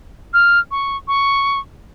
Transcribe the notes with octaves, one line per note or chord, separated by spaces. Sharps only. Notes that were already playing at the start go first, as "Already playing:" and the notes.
F6
C#6
C#6